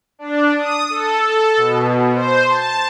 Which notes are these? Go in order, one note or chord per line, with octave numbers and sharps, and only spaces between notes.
D4
D#6
A4
A4
B2
C5
A5